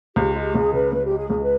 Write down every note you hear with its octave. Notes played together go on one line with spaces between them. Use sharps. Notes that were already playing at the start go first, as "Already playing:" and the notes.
C#2 G4
G#3
G4
C#2 G#4
C#3 B4
C#2 B4
G4
G#3
G#4
C#2 G#4
B4